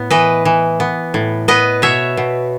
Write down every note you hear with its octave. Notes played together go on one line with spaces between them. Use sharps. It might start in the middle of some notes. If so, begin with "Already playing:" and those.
Already playing: A2 B3
E3 B4 D#5
E3
B3
A2
B3 B4 D#5
B2 C#5 E5
B2